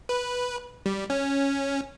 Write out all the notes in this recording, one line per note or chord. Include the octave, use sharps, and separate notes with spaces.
B4
G3
C#4